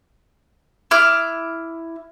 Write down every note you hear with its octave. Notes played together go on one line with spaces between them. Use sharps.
E4 D6 F6